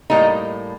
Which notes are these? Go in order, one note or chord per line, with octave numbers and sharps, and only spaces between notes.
A2 G3 A#3 D#4